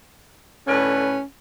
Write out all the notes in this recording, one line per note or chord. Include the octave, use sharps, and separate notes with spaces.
A2 D3 C#4 B4